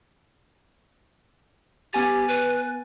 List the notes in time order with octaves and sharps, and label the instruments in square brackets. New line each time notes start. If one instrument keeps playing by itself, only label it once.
[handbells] B3 G#5 A6 [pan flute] G4
[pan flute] B4